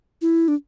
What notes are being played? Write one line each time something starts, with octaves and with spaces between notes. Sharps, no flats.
E4
D4